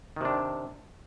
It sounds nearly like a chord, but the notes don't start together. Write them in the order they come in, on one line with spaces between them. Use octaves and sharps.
D#3 C3 D4